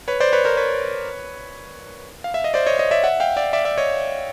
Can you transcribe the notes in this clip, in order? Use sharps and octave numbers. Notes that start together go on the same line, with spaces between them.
B4 C#5
C5 D5
B4 C#5
A#4 C5
B4 C#5
F5
E5
D#5
C5 D5
C#5 D#5
C#5 D#5
D5 E5
E5 F#5
F5 G5
D5 E5
D5 E5
D5 E5
C#5 D#5